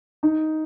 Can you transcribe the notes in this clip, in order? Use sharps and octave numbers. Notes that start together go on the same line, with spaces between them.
D#4